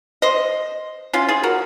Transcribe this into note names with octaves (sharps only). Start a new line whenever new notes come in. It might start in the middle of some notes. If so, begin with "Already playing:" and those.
C5 D#5
C#4 F4
F4 G#4
F#4 A#4